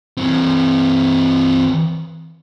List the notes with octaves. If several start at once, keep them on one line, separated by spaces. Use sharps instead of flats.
E3 C4